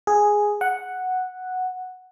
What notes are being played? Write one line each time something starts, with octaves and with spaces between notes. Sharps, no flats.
G#4
F#5